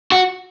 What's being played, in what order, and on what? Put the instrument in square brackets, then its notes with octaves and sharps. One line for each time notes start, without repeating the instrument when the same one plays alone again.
[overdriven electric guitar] F#4